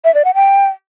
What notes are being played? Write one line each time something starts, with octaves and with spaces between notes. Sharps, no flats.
E5
D5
F#5
G5